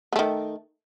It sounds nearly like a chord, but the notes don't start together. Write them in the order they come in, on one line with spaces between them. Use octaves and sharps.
B3 A3 D#3